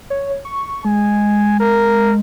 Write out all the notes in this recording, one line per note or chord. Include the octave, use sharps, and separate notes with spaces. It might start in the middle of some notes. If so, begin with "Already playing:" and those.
C#5
C#6
G#3 G#5
A#4